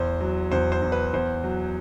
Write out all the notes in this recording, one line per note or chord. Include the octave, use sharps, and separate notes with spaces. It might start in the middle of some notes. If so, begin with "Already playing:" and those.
Already playing: E2 C5
F#3
E2 C5
C5
E2
B4
E2 C5
F#3